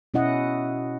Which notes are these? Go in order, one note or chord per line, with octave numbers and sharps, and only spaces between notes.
B2 C#4 E4 D#5 F#5